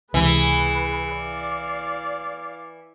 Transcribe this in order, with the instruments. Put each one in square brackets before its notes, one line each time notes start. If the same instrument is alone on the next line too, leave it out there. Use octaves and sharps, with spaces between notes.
[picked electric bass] C#2 C3 [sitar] E3 [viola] G#4 B4
[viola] D5 F5